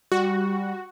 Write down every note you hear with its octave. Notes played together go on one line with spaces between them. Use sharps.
G3 F#4